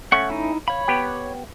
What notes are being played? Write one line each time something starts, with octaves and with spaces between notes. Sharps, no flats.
A3 C#4 F#5 C#6
D#4 E4
C#5 F5 B5
B3 G4 G5